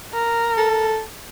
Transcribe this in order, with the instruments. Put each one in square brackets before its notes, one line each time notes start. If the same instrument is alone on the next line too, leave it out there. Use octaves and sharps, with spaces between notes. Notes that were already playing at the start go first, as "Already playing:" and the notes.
[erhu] A#4
[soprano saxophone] A4